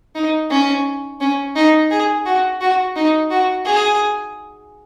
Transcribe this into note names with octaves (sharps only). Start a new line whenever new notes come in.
D#4
C#4
C#4
D#4
G#4
F#4
F#4
D#4
F#4
G#4